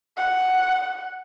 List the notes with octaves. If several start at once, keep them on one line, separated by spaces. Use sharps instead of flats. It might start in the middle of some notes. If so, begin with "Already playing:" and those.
F#5